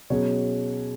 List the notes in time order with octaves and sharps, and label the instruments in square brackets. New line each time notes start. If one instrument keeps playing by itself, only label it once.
[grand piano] B2 F#3 C#4 G#4 C#5